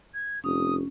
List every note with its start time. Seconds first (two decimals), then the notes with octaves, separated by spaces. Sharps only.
0.14 G#6
0.44 F1 C#4 D#6